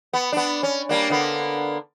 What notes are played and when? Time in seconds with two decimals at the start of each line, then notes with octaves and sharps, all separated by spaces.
0.13 B3
0.32 B3 D4
0.63 C#4
0.89 G3 A#3 D4
1.10 D3 A#3 B3